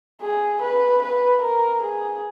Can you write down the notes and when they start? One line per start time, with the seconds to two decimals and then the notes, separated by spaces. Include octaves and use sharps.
0.21 G#4
0.62 B4
1.02 B4
1.42 A#4
1.83 G#4